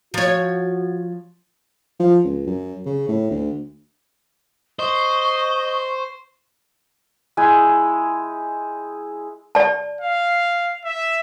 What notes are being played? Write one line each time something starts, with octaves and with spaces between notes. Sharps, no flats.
F3 F#4 C#5
F3
C#2
F#2
C#3
A2
D2
C5 D#5 C#6
G#3 E4 G5 G#5
D5 A5
F5
E5